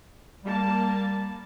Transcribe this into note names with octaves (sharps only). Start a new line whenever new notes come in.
G3 A#3 A5